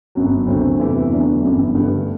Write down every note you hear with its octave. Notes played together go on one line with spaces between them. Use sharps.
G1 F#2 F#3
D2 C3 F#3 A3 C4
E2 C3 E3 A3 E4
E2 D3 F#3 A3 D4
G1 F#2 E3
G2 D3 A3